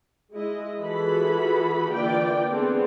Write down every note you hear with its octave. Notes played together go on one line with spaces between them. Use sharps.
G#3 E4 D#5
E3 F4 F#4 G#4 A4 B5
D3 E3 A#3 F4 D5 G5
B3 C4 D4 G#4 A4